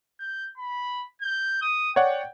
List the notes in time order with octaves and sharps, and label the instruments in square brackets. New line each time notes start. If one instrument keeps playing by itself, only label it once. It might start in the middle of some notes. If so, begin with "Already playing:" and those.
[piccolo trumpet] G6
B5
G6
D#6
[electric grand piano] C#5 D5 F#5 [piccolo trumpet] G5